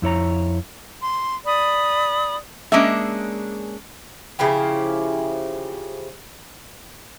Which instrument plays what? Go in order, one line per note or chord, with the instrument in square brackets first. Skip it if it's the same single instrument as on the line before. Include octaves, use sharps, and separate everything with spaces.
[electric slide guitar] F2 E4 C#5 A#5
[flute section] C6
D5 B5 D#6
[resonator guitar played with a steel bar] G#3 A#3 C#4 D4 G#4 E5
[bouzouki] C#3 F3 E4 G4